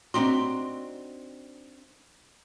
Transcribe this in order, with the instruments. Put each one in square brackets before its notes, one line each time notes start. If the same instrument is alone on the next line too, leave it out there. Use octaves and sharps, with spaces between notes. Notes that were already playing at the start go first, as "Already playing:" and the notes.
[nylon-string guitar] C4 D4 F#4 [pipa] D#4 G4 C6